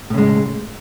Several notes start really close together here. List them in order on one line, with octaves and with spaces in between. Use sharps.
A2 C#3 G#3